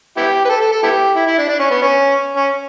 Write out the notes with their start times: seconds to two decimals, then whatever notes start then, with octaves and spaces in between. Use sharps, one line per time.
0.17 B3 E4 G4
0.45 B4
0.49 A4
0.61 A4
0.72 A4
0.83 B3 E4 G4
1.16 E4
1.27 E4
1.38 D4
1.48 D4
1.60 C#4
1.71 B3
1.82 C#4
2.37 C#4